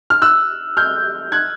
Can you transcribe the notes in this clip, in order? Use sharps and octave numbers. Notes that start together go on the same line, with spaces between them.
F6
E6 F#6
F6 G6
F#6 G#6